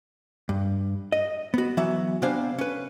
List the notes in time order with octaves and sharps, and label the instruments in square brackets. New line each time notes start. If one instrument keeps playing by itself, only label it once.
[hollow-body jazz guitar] G2
D#5
B3 F#4
E3 F#3 B3 E5
C3 B3 D4 C5 F5 G#5
C#4 B4